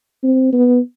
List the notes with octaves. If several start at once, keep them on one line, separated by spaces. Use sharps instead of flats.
C4
B3